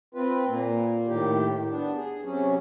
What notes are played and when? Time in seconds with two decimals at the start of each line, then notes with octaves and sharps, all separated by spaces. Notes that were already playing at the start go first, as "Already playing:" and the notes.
0.15 C4 F4 B4
0.48 A#2 A#3
1.07 A2 D#3 G4
1.70 B3 D4
1.96 G#4
2.24 C3 F#3 C#4